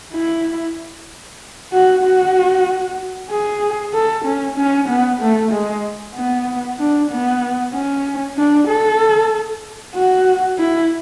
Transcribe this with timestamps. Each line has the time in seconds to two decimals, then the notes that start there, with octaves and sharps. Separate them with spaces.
0.13 E4
1.72 F#4
2.03 F#4
3.30 G#4
3.93 A4
4.25 C#4
4.57 C#4
4.89 B3
5.20 A3
5.52 G#3
6.15 B3
6.79 D4
7.11 B3
7.74 C#4
8.37 D4
8.68 A4
9.95 F#4
10.58 E4